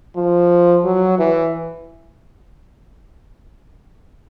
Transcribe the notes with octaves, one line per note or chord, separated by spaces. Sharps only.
F3
F#3
E3